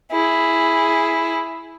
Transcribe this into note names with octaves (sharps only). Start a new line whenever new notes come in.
E4 G#4